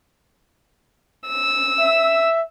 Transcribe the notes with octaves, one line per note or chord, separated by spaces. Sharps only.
E6
E5